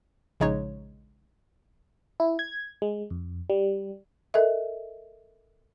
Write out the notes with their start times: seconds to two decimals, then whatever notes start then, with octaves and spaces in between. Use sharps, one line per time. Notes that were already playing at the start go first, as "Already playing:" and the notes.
0.40 A#1 C#3 G#3 D#4 C#5
2.20 E4
2.39 G#6
2.82 G#3
3.10 F2
3.50 G3
4.34 A4 A#4 D#5 E5